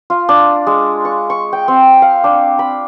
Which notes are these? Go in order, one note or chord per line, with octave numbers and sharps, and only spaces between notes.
F4
D4
G#3
C#6
C#6
G5
C4
F5
D4
B5